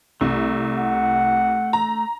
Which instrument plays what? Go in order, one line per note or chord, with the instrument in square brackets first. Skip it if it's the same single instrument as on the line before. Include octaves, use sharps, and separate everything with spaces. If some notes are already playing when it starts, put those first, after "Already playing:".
[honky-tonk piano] C2 [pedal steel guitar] A3
[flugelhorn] F#5
[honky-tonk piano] A#5